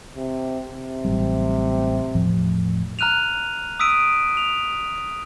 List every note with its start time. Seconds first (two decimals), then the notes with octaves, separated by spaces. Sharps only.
0.16 C3
0.72 C3
1.05 A1 F#3 G3
2.15 E1 A2 F3
2.99 A#5 F6 F#6 D#7 F7
3.79 D#6 E6 B6 D7 D#7
4.37 F7